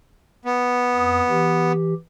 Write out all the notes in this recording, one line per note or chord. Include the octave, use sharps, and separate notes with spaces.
B3
F2 D#6
E3 G4